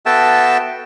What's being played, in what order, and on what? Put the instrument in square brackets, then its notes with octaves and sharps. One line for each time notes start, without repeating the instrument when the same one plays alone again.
[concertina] B3 F#4 A4 E5 G5 A5